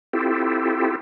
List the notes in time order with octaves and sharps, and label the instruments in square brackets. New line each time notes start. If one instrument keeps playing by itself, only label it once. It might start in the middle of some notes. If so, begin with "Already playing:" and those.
[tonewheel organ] C4 E4 F4 G4 A4